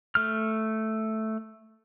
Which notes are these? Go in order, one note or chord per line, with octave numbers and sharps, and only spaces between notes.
A3 F6